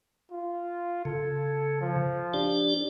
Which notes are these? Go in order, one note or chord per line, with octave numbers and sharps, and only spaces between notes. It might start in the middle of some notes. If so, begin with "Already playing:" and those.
F4
C#3 A4
F3
D4 G4 D5